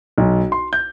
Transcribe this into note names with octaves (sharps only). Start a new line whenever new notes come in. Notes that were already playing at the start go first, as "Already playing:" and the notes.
B1
C6
G6